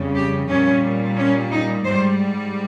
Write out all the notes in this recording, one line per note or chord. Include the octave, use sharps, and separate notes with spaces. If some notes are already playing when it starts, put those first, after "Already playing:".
Already playing: F2 C#3 G3
G4
A#2 G3 C#4
C#4
D#4
G#2 G3 C5